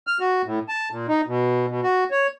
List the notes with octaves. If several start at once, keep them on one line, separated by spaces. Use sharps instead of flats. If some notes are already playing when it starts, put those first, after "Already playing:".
F6
F#4
A2
A5
A#2
D#4
B2
B2
F#4
C#5